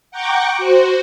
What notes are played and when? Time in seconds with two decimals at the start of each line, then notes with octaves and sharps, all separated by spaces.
0.11 F#5 G5 A#5 C#6 D6
0.58 F#4 C5